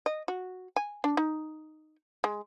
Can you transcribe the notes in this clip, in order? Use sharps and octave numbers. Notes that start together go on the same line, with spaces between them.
D#5
F#4
G#5
D4
D#4
G#3